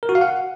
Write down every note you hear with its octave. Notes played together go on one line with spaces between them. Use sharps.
A#4
F#4
F5
F#5